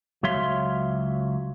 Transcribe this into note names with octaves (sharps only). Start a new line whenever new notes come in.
C#2 F#3 C#5 E5 F5 C6